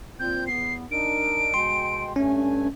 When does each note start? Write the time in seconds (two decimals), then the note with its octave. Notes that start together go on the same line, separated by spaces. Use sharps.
0.20 A#2 C4 G6
0.47 E2 B3 C7
0.91 D4 D#4 A#4 D7
1.54 B2 G#3 G5 C6
2.16 G2 A3 C#4 G#5